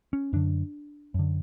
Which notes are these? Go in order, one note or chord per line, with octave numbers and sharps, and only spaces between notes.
C#4
F#2 D3 D4
F#2 D3